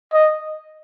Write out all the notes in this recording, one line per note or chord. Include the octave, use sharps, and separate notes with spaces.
D#5